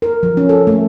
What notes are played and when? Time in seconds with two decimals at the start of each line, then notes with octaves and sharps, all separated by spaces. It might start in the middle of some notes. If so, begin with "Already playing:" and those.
0.02 A#4
0.23 F3
0.37 C#4
0.49 A4
0.67 A3